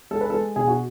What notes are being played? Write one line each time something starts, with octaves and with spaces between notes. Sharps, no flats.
G#3 A4
B4
A4
G#3
B2 G#4
F#4